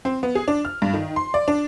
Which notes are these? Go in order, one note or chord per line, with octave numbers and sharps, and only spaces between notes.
C4
B3
G#4
D4
F6
G2
D#3
C6
D5
D4